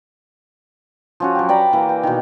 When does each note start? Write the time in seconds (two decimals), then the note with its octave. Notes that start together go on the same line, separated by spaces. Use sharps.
1.20 F3 C#4 F#4
1.35 F#3 G4
1.49 D5 G5 A#5 B5
1.73 E3 A#3
1.89 G5
2.03 B2 D#3